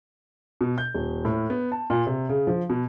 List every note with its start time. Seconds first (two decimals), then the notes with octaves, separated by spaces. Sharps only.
0.61 B2
0.78 G6
0.94 D#1
1.25 A2
1.50 B3
1.72 A5
1.90 A#2
2.07 C3
2.29 C#3
2.47 F3
2.70 B2